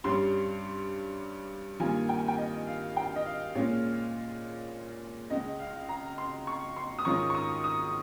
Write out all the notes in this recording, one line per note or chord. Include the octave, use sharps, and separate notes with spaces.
G2 G3 C#4 C6
G2 D#3 G3 A#3 F4 G#5
G5
G#5
G5
D#5
F5
G5
D#5
F5
A#2 G#3 C#4 F4
C#2 C#3 G#3 D#5
F5
A#5
C6
C#6
C6
D#6
G#2 D#3 G#3 C#4 F4 C#6
C#6
D#6
D#6